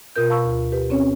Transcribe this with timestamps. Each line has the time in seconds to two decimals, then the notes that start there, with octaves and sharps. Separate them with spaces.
0.16 B2 F4 A#4 G6
0.30 F5 A5 B5 C#6 E6
0.45 D2 F4
0.72 G4 B4
0.90 C4 C#4 C#5